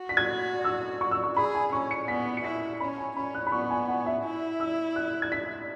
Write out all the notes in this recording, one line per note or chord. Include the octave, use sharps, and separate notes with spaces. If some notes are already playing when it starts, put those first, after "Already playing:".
Already playing: F#4
B6
G#6
E6
C#6
E6
C#6
G#4 B5
G#5
C#4 C#6
C#7
B3 B6
C#7
E4 B6
C#4 B5
G#5
C#4 B5
F#6
B5
B3 C#6
G#5
F#5
E5
E4
E6
F#6
G#6
B6